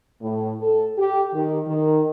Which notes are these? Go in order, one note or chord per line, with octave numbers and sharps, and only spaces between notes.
A2
A4
G4
D#3
D#3